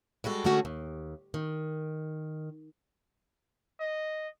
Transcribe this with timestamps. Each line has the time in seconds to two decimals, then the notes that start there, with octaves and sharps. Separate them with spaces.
0.24 G3 G#3 F#4 A4
0.44 D3 G#3 A3 C#4 F#4 G#4
0.65 D#2
1.34 D#3
3.80 D#5